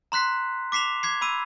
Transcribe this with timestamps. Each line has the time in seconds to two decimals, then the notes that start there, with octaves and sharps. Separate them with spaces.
0.12 A#5 C6 F#6 B6 C7
0.72 D6 B6 C7 E7 F7
1.03 D6 G#6 C7
1.21 B5 E6 D#7